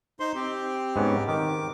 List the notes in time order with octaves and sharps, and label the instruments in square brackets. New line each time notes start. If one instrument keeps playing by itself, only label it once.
[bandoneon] D#4 C5 C6
C4 G4
[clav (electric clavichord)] G#2 B3 C#4
[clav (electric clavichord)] D#3 [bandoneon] D6